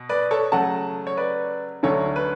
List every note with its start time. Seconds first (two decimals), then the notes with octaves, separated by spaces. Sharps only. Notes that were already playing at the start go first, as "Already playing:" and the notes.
Already playing: B2
0.09 B4 D5
0.31 A4 C#5
0.52 C#3 F#3 A3 F#5 A5
1.07 C#5
1.17 B4 D5
1.83 D2 D3 F#3 C#4 A4 C#5
2.16 B4